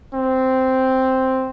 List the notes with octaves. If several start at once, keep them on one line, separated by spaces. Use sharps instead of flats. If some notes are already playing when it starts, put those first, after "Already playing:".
C4